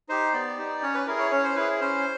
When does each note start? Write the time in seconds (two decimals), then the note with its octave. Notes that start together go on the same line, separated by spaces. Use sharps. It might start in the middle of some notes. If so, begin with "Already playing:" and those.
0.09 D#4 G4 C5
0.33 B3 D5
0.58 D#4 G4
0.82 C#4 C#5
0.95 B4
1.07 E4 G#4 A#4
1.19 C#5
1.31 C#4 C#5
1.44 C5
1.56 E4 G#4 B4
1.80 C#4 C5